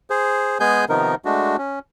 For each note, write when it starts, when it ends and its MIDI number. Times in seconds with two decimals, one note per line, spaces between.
0.10 0.58 68
0.10 0.58 72
0.60 0.85 56
0.60 0.85 59
0.60 0.85 68
0.60 0.85 80
0.60 0.85 91
0.89 1.15 48
0.89 1.15 51
0.89 1.15 53
0.89 1.15 59
0.89 1.15 63
0.89 1.15 70
1.25 1.57 56
1.25 1.57 57
1.25 1.57 62
1.25 1.57 66
1.58 1.79 61